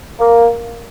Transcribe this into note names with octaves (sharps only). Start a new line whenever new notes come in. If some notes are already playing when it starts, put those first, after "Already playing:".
A#3